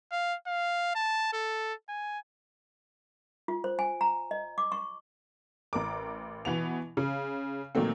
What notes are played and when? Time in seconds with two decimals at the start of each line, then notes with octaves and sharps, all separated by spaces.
0.12 F5
0.47 F5
0.95 A5
1.33 A4
1.89 G#5
3.48 F4
3.64 C5
3.79 G#5
4.01 A#5
4.31 D#5
4.58 D6
4.72 C#6
5.73 A1 A#4 D6
6.45 B2 E3 B3 F7
6.97 C#3
7.75 A#2 D#3 F#3 A3 C4